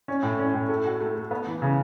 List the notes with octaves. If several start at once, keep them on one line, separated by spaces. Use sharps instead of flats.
C#4
A2
C#4
A2
A3
F#4
A3
A3
B3
E3
C#3